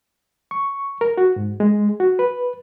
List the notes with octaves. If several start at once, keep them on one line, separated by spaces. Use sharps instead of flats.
C#6
A#4
F#4
G#2
G#3
F#4
B4